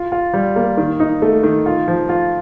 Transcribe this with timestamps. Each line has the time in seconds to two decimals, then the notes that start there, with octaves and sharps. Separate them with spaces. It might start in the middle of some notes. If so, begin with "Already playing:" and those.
Already playing: F4
0.12 F4
0.34 G3
0.56 A#3
0.77 D#3
1.00 D#4
1.22 A3
1.43 D#3
1.66 F4
1.88 F3
2.09 F4